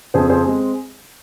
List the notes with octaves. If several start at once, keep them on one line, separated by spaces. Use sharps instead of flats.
F2 C#3 F3 G#4 C5
G#4 C5
G#3 C4